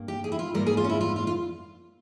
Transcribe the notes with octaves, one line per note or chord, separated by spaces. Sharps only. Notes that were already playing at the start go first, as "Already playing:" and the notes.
Already playing: G2 A#3
G4
G#4
E4
F4
G#2 G3 A#3 A#4
G#4
F4
C#4
E4
F4
F4
F4